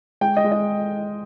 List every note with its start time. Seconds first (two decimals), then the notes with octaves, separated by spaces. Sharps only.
0.21 G#3 G5
0.37 D#5
0.44 G#3
0.52 D#5